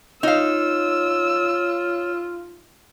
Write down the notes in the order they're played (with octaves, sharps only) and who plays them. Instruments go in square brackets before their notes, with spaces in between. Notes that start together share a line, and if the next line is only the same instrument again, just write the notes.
[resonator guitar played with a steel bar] D#4 F5 [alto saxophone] F4 [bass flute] C#5 [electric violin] E6